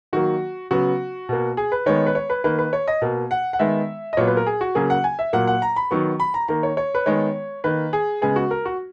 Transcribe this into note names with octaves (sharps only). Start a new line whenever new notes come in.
D#3 F#3 A#3 F#4
C#3 F#3 B3 F#4
B2 A#3
G#4
B4
D#3 G#3 B3 C#5
B4
C#5
B4
D#3 A#3 B4
B4
C#5
D#5
B2 A#3
F#5
F#5
D#3 G#3 B3 E5
D#5
A#2 F#3 B3 C#5
B4
A#4
G#4
F#4
C#3 F#3 A#3 G#4
F#5
G#5
E5
A#2 F#3 A#3 F#5
F#5
A#5
B5
D#3 F#3 B3 C#6
B5
A#5
D#3 A#3 A#5
C#5
C#5
B4
D#3 G#3 B3 C#5
D#3 A#3 B4
G#4
C#3 G#3 B3 G#4
F#4
A#4
F#4